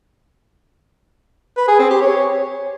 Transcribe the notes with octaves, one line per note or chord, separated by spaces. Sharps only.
B4
G#4
C4
G4
C#5